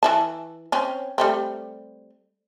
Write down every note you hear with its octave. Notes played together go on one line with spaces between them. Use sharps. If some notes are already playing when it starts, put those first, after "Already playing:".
E3 E4 A5
C4 C#4
G3 A3 C4